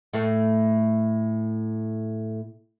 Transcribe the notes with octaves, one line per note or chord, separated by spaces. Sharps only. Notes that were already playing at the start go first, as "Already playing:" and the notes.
A2 A3